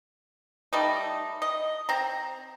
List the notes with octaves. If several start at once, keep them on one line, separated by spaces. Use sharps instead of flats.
G3 A3 D#4
D#5
C4 A#5